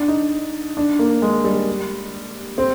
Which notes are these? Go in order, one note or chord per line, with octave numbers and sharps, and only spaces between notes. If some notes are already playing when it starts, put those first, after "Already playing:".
Already playing: D4
D#4
D4
A#3
G#3
G3
C4